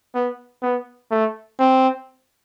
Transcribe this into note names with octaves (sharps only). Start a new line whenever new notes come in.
B3
B3
A3
C4